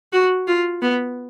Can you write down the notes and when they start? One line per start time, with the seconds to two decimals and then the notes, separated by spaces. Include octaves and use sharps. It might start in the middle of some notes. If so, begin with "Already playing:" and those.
0.13 F#4
0.47 F4
0.82 B3